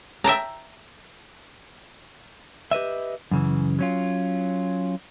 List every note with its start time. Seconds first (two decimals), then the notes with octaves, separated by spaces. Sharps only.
0.24 E5 G5 A5 A#5
2.71 G4 B4 D#5 E5
3.31 F#2 C#3 E3
3.79 F#3 C#4 F4